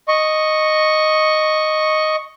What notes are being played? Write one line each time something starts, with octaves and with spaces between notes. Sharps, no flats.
D#5 C#6